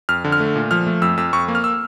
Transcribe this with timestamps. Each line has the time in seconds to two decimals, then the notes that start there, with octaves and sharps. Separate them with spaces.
0.09 F2 F6
0.24 D3
0.32 F6
0.40 A3
0.56 A#2
0.71 F3 F6
0.87 A3
1.02 F2 E6
1.17 F2 E6
1.33 F2 C#6
1.48 A#3
1.55 F6
1.64 E6